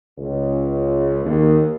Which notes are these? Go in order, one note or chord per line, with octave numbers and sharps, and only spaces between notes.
C#2
D#2